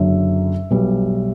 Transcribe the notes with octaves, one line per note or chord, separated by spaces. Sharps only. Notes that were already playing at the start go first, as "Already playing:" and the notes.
Already playing: F#1 F#2 D3 F#3 E5
B1 B2 G3